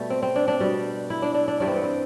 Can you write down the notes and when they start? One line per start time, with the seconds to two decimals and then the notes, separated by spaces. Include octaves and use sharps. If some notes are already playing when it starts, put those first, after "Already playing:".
Already playing: B2 G3 A3
0.10 C4
0.23 C4
0.36 D4
0.48 D4
0.60 B2 G3
1.10 E4
1.22 D4
1.34 D4
1.48 D4
1.60 G2 E3 G3 D4
1.67 C4
1.76 B3
1.84 C4